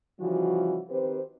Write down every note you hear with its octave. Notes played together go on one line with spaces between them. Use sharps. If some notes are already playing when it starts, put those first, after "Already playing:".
C#3 E3 F3 G3 F#4
D#3 C4 G4 B4 C5